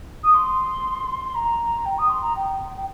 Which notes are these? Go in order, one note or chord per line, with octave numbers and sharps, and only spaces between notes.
D#6
C6
C6
A#5
G5
D#6
C6
A#5
G5
G5